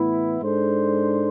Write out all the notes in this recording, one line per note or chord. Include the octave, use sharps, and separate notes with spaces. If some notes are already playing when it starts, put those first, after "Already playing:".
Already playing: A2 E3 B3 E4
G#2 G#3 D4 A4 C5